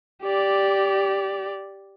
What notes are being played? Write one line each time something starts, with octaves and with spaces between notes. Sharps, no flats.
G4 D5